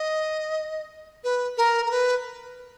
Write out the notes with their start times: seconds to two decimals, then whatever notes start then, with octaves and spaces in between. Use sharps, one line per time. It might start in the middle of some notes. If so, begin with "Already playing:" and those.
Already playing: D#5
1.24 B4
1.58 A#4
1.86 A#4
1.91 B4